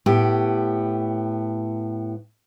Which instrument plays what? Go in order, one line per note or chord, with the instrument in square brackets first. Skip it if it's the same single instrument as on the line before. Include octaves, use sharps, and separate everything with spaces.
[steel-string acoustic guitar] A2 B3 G4